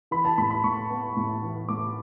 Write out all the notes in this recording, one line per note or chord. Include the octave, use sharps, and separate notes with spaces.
E3 B5
A5
A2 B5
B5
A2 C#6
B3
A2
E3
A2 D6